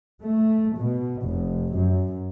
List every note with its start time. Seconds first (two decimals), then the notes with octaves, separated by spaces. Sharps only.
0.23 A3
0.76 B2
1.25 F1
1.74 F#2